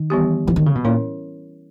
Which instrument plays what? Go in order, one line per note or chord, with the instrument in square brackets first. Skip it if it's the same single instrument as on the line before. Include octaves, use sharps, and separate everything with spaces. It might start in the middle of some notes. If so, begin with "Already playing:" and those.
Already playing: [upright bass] D#3
[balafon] E3 G3 B3 E4 G4
[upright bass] E3
D#3
C#3
B2
[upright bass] A#2 [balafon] C#4 E4 A#4 C#5